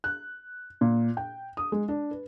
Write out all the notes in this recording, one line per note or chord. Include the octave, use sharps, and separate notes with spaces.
F#6
A#2
G5
D#6
G#3
D4
B4